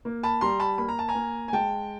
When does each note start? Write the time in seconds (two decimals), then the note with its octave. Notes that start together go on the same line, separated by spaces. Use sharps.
0.05 A#3
0.23 A5 B5
0.41 G3 A#5 C6
0.60 A5 B5
0.78 A#3 B5
0.88 A#5
0.99 A5
1.08 G#5 A#5
1.15 A#3
1.48 G#5
1.53 G#3 G5 A5